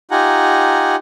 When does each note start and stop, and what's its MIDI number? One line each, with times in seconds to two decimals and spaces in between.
0.11 0.96 63
0.11 0.96 65
0.11 0.96 67
0.11 0.96 78
0.11 0.96 80
0.11 0.96 82